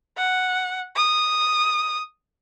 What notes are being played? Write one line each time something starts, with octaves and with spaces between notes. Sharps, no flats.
F#5
D#6